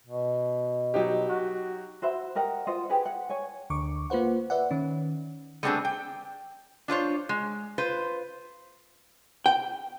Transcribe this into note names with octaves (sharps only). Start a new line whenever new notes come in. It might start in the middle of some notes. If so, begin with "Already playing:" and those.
B2
F#3 D#4 G4
F#4
F#4 C5 E5 B5
G4 A#4 D#5 F#5
F4 C5 D#5 F#5
G4 G#4 B4 F#5
F#5
C#5 G#5
D2 D3 C#6 D6
A#3 F4 B4 C5 F#5
B4 D5 E5 F#5
D#3 C#4
G3 A3 B3 C4 D4 G#4
G5
D4 F4 C5 C#5
G#3
F4 B4 C5
G5